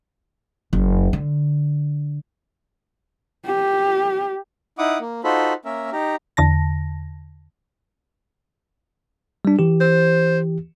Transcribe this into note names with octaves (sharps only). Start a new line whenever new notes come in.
F#1
D3
G4
D#4 E4 F#5 D6 D#6
A#3
D#4 F4 F#4 A4 C5 B5
A#3 C#4 A#4 E5
D#4 G4 A#5
E2 D3 A5 A#6
G3 D4
E3 G4
C5